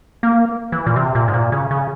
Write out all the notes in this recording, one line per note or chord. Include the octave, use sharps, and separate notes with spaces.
A#3
E3
A#2
C3
A#2
G#2
A#2
C#3
C#3